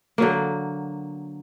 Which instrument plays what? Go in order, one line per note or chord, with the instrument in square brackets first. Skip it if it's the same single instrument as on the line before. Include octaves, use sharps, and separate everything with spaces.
[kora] D3 F#3 A#3